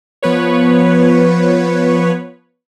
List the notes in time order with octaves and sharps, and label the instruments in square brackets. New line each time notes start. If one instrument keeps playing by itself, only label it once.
[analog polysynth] F3 B3 B4 C#5